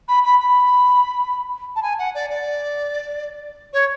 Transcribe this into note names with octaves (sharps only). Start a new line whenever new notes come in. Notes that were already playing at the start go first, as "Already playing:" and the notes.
B5
B5
B5
A5
G#5
F#5
D5
D5
C#5